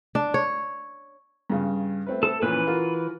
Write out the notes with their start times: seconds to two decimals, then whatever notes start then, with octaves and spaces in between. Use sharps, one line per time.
0.15 D4
0.34 C#5
1.50 G2 C#3
2.06 A3 C4 B4
2.23 A4
2.42 A#2 E3 F3 C#4 B4
2.67 F4 F#4 A#4